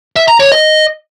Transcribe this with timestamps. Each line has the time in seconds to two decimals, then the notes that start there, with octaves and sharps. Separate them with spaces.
0.16 E5
0.28 A#5
0.40 C#5
0.52 D#5